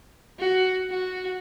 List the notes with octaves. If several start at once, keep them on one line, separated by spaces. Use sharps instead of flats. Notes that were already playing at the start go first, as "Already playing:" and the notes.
F#4
F#4